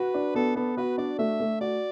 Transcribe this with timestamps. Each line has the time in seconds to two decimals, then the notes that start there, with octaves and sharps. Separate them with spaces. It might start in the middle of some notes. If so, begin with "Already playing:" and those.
Already playing: F#4 B4
0.14 D4
0.35 B3 A4
0.56 B3 A4
0.77 F#4 B4
0.98 D4 D5
1.19 A3 E5
1.40 A3
1.61 F#4 D5